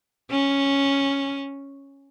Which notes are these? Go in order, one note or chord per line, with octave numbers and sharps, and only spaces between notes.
C#4